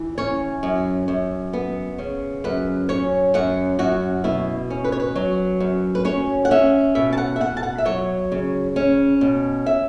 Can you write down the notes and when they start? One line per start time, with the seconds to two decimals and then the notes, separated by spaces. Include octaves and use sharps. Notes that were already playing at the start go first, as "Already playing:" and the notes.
Already playing: E3
0.18 C#4 C#5
0.63 F#2
1.08 F#2
1.53 B3
1.99 C#3
2.44 F#2 B4
2.89 C#4 C#5
3.34 F#2 F#5
3.79 F#2 F#4
4.24 B2 E4
4.70 C#4
4.84 B4
4.92 C#5
5.00 B4
5.16 F#3
5.60 F#2
5.95 B4
6.05 C#4 C#5
6.45 F#5
6.51 C#4 E5
6.95 B2 E5
7.13 A5
7.18 F#5
7.36 E5
7.41 B2 F#5
7.57 A5
7.63 F#5
7.78 E5
7.85 F#3 C#5
8.32 C#3
8.76 C#4
9.21 B2
9.66 E5